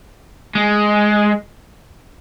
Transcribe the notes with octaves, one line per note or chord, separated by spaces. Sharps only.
G#3